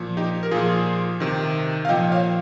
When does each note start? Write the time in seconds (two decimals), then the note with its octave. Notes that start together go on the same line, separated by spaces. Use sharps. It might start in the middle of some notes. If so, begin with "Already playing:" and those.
Already playing: A#2 F3
0.17 D#4 G4
0.43 A#4
0.51 A#2 F3 F4 G#4
1.20 C3 D#3
1.85 F5
1.89 A#2 F3 D#5 G5
2.12 C#5 F5